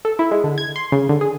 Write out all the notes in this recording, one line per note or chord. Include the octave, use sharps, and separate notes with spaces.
A4
E4
G#3
D3
G#6
C6
C#3
D3
G#4